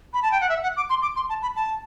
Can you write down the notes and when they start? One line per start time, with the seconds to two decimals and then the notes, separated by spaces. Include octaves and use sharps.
0.14 B5
0.22 A5
0.32 G5
0.41 F#5
0.49 E5
0.63 F#5
0.76 D6
0.90 C6
1.02 D6
1.16 C6
1.29 A5
1.42 B5
1.56 A5